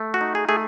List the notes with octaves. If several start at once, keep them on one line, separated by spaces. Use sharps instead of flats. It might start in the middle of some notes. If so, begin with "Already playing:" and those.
Already playing: A3
F#4
D#4
G#4
A3 G#4